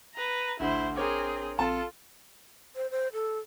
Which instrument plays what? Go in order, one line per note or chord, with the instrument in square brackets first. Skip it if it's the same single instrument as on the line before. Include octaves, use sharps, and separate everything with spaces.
[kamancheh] B4 A#5
[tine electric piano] A1 D4 [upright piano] D2 [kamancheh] E4 C5
[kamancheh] C4 G#4 [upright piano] A#4 C#5 D6
[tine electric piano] A#1 C4 F6 [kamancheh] F4 A4 [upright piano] A5
[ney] C5
C5
A4